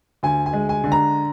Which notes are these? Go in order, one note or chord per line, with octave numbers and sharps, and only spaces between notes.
D2 G#5
G#5
G#3
G#5
D3
A#5